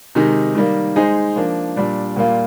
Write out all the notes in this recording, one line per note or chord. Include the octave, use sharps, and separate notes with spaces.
C3 D#3 G#3 D#4
D#3 G3 A#3
G#3 D#4 G#4 C5
F3 A#3 D4
A#2 G3 D4
A#2 G3 A#3 F4